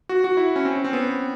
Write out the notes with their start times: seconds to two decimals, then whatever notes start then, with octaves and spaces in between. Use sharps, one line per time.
0.09 F#4
0.24 F#4
0.37 E4
0.56 C#4
0.65 C4
0.75 C#4
0.85 C4
0.93 B3